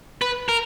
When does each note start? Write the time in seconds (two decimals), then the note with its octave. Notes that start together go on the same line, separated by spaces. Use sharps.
0.22 B4
0.49 A#4